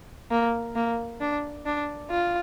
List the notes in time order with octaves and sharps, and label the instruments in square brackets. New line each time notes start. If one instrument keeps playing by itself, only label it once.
[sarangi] A#3
A#3
D4
D4
F4